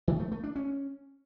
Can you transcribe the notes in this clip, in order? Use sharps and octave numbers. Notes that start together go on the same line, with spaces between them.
D#3
A3
A3
D4
C#4